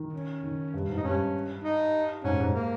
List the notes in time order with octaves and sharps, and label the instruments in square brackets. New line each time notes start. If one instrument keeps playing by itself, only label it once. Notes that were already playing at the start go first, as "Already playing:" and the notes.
Already playing: [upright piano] D#3
[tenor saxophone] C#4
[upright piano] D#3
G2
G#2
[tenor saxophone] D#4
[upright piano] G2 [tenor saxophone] C#4
[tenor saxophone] D#4
[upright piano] G#2 [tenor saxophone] C#4
[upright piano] G#2
[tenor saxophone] A#3